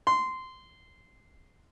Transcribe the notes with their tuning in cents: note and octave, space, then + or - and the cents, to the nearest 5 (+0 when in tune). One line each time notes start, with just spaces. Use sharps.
C6 -15